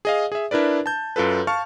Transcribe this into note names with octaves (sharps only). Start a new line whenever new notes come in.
G#4 D#5 F5
G#4 E5
D4 E4 A#4 B4 D5
A5 G6
F#2 F4 A4 B4
F5 A5 C#6 F6